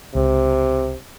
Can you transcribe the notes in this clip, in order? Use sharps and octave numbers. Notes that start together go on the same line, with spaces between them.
C#2 C3